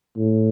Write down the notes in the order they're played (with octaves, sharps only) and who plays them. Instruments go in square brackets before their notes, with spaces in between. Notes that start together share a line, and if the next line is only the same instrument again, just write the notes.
[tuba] A2